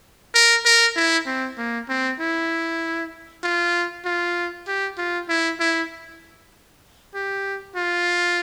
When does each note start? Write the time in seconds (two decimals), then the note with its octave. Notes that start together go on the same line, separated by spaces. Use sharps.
0.34 A#4
0.65 A#4
0.96 E4
1.26 C4
1.57 A#3
1.89 C4
2.20 E4
3.43 F4
4.05 F4
4.67 G4
4.98 F4
5.29 E4
5.60 E4
7.14 G4
7.76 F4